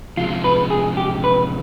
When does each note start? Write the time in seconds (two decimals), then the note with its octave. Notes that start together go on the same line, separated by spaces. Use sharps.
0.17 C3 F3 G#3 F4
0.44 B4
0.70 G#4
0.97 G4
1.24 B4